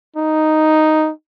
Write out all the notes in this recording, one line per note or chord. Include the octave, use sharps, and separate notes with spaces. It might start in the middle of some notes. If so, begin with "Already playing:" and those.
D#4